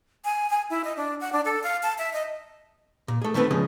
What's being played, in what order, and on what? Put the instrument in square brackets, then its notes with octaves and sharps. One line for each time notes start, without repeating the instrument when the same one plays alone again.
[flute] G#5
G#5
E4
D#5
D4
F#5
D4
A4
F5
A5
E5
D#5
[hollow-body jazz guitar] A#2
A3 G#4
D#3 A3 B3 C4 B4
C#3 F3 G#3 C#4